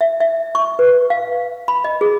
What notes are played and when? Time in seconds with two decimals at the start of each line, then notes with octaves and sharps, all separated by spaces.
0.01 E5
0.20 E5
0.55 C#6
0.79 B4
1.10 F5
1.68 B5
1.84 D#5
2.01 G#4